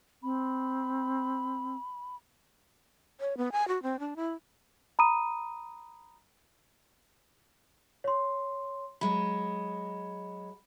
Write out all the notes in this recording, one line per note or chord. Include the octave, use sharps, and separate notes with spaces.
C4 B5
C#5
B3
G#5
F#4
C4
D4
E4
A#5 B5 D#6 D#7
C#5 C6
F#3 G#3 B5